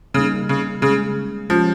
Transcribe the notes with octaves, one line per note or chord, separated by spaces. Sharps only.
C#3 G3 A#3 D#4
C#3
C#3 G#3 C#4 G#4
F3 G#3 C#4 G4